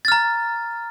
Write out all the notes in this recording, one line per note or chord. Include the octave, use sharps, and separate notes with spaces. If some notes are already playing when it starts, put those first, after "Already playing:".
A#5 F6 A6